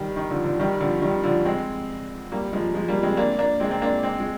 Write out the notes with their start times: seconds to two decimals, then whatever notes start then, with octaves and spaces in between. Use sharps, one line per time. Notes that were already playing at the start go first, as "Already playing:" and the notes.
Already playing: D#3 G3
0.16 D#3
0.30 D3 F3
0.44 D3 F3
0.59 D#3 G3
0.80 D3 F3
1.02 D#3 G3
1.23 D3 F3
1.45 G#3 C4
2.32 G3 A#3
2.53 F3 G#3
2.74 F3 G#3
2.88 G3 A#3
3.03 G#3 C4
3.17 A#3 D4
3.39 A#3 D4
3.60 G#3 C4
3.71 C4
3.82 A#3 D4
4.03 G#3 C4
4.20 G#3